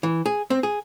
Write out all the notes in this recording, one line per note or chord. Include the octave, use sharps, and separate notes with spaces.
E3
G#4
C4
G#4